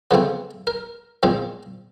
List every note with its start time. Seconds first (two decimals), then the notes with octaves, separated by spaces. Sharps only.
0.11 C#3 F3 A3 C4 B4
0.67 A#4
1.23 A#2 F3 G#3 C4